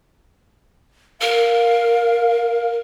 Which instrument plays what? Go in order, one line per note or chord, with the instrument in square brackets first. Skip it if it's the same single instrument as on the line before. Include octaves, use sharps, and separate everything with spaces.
[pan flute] A#4 [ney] F5